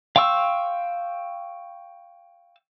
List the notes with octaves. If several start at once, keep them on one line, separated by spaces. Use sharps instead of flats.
F5 G5 C6 C#6 E6